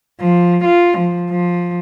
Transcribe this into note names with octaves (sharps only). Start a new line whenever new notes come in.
F3
F4
F3
F3